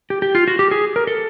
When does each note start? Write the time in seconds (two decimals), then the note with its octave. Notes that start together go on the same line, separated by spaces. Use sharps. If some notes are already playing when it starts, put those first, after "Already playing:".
0.10 G4
0.22 G4
0.35 F4
0.48 F#4
0.59 G4
0.71 G#4
0.96 A#4
1.07 A4